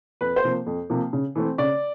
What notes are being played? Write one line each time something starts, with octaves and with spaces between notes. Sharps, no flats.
F2 B4
C5
C3 F3 A#3
F2
C3 F3 A#3
C#3
E3 A3 C4
C#3 D5